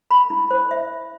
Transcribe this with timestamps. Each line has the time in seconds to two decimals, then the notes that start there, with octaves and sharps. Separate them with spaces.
0.11 B5
0.30 E4
0.51 C5
0.71 E5